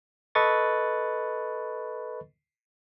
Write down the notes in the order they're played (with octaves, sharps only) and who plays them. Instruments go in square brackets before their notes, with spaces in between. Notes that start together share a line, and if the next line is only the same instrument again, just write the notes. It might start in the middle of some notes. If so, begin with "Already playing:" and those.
[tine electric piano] A4 B4 D#5 C#6 A6